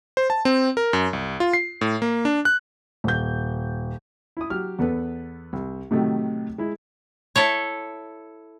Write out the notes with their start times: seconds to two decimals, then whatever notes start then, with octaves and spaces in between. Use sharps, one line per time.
0.17 C5
0.30 A5
0.45 C4
0.77 A#4
0.93 F#2
1.13 C2
1.40 F4
1.54 C7
1.81 A2
2.02 A#3
2.25 D4
2.45 F#6
3.04 D#1 G6
4.37 E4 D#6
4.50 F#3 G4 F6
4.79 E2 B3 A4 B4
5.53 C2
5.91 A2 C3 D#3 F#3 A3
6.58 G#3 E4
7.36 E4 A4 C#5